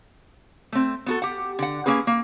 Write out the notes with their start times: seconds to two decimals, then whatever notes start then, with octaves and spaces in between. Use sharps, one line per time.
0.72 A3 C4
1.06 B3 F#4 A4
1.22 G4 F#5
1.59 D3 F#5
1.86 A#3 C#4 G#4 B4
2.07 A#3